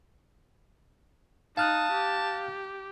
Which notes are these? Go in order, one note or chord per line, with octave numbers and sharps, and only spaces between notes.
D#4 F5 A5 D#6 F6 F#6
G4